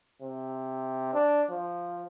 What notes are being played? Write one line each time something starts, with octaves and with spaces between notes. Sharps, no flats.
C3
D4
F3